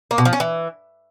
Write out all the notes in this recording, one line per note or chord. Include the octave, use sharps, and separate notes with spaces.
A#3
B2
F3
C#4
E3